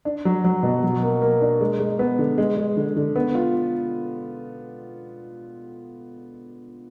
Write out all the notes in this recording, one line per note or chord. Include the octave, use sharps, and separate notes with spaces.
D4
F#3
F#3
B2
F#3
A#3
A#3
D4
G#3
G#3
B3
D3
G#3
G#3
D3
D3
B3
F4